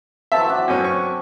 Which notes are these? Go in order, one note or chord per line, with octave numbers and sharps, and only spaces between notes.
F#3 C4 E5 A5
D4
F#2 C#4
C#6